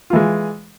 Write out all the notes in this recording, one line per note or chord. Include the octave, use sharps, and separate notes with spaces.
E3 G#3 F4